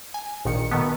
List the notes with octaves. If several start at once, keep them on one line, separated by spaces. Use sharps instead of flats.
G#5
A#1 A#2 D#3 C#7
B2 D#3 A3 B3